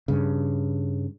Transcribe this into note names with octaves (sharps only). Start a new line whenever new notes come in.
G2 C#3